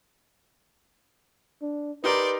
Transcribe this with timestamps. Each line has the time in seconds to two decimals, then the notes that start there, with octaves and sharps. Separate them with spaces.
1.62 D4
2.04 D#4 G4 A#4 B4 D5 C6